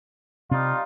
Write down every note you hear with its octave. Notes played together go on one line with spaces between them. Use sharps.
C3 G3 C4 D#4 F4